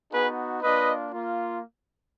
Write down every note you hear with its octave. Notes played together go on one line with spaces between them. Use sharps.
B3 D#4 F#4 G#4 B4
A#3 D4 F4 B4 D#5
A#3 F4